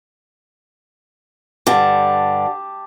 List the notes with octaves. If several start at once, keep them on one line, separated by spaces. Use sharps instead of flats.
G2 D3 G4 A5